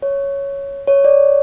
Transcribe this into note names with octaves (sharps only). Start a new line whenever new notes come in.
C#5
C#5
D5
C#5